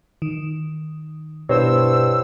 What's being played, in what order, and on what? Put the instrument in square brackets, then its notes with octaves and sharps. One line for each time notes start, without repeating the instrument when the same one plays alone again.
[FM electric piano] D#3
[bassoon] G2 [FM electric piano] B2 [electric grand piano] E4 C5 C#5 [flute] E6